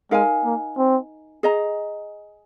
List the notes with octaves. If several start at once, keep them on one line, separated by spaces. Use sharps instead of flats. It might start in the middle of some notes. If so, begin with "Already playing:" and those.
G#3 D#4 A#4 F5 G#5
A#3
C4
G#4 D#5 A#5